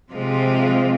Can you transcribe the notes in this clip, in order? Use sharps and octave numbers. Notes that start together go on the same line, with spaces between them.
C3 F3 G#3 C4 F4